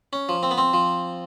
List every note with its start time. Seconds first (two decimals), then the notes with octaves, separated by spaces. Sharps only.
0.13 C#4
0.29 F3
0.43 C4
0.51 B3
0.58 C4
0.73 F3